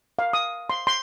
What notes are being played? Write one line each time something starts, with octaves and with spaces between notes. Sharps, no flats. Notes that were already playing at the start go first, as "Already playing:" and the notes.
F5
D#6
C6
C6